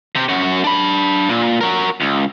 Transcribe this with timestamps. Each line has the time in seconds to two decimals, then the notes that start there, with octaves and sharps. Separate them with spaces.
0.15 C3 G4
0.29 F#2 F#4
0.64 D4 B5
1.29 A#2
1.61 F#4 A#4
2.00 C#2